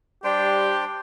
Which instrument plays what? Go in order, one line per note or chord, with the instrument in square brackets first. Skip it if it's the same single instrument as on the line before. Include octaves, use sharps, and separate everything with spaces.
[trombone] G3 [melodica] D4 C5 G5 [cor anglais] G4